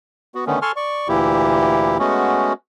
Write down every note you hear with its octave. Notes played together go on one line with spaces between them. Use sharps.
B3 F#4
D3 D#3 A3 B3 C#4
A4 G#5 A5 C6 C#6 F6
D5 C#6
D2 A#2 E3 A#3 E4 G4
G#3 A3 B3 C#4 F#4